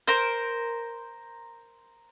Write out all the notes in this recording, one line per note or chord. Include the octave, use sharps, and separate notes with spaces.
A#4 C5